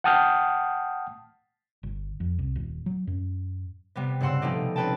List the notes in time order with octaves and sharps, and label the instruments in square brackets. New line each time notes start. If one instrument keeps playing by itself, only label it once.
[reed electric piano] F#5 G5 A5 D#6 F6 G6
[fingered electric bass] G1
F2
C2
D#1
F#3
F#2
[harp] C3 G3 B3
G2 C#3 C4 F#5 C6 E6
B2 F3 G3 A3 D#4 G4
C4 C#4 B4 G5 A5